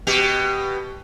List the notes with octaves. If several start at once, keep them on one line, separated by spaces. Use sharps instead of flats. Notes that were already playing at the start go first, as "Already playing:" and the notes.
B2 G4